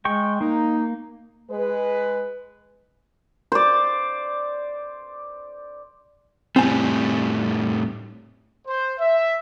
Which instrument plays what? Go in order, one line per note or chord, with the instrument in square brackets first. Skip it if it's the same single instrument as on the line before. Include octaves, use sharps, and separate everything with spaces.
[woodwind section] G#3 [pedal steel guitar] G5 C#6
[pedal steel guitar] A#3 [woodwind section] D#4
[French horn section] G#3 B4
[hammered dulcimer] C5 D5
[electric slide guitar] A2 G3 [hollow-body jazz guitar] C4 G#5
[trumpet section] C5
E5